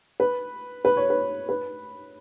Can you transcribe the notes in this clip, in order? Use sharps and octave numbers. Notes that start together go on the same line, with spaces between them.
B4
B4
C#5
B4
B4